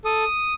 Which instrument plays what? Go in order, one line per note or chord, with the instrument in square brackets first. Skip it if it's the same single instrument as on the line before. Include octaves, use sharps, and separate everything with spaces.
[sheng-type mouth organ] A4 D#6